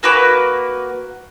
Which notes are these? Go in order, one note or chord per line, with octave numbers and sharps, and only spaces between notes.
A#3 F#4 B4 D6